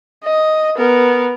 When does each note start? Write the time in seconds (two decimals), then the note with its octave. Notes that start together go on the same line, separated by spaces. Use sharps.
0.24 D#5
0.77 B3 A#4